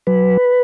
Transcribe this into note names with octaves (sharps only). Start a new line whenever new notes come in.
F#3 B4